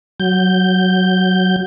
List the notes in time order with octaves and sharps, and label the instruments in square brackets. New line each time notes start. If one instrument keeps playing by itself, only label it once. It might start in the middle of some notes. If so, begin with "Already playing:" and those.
[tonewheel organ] F#3 G6